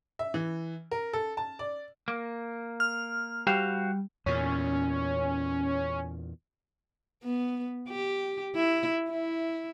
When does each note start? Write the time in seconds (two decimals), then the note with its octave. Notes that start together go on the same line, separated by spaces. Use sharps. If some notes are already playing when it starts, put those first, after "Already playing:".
0.19 E5
0.34 E3
0.91 A#4
1.13 A4
1.37 A5
1.59 D5
2.08 A#3
2.80 F6
3.47 G3 F#4 C5 F5
4.26 E2 A#2 C#4
7.24 B3
7.89 G4
8.55 E4
9.10 E4